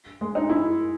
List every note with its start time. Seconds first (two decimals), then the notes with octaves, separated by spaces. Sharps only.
0.21 G#3
0.35 D#4
0.49 E4